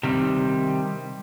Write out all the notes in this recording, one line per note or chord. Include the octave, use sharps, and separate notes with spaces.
C3 D#3 G3